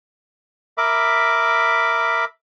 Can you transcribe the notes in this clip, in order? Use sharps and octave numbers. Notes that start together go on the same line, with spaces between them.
A#4 E5 B5 D6